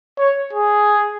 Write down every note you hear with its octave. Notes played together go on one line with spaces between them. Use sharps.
C#5
G#4